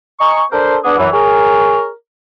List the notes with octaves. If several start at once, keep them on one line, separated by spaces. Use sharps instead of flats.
D#5 G#5 A#5 C#6
D4 A4 A#4 C5
B3 D4 G#4
F#2 E3
G#4 A#4 C#5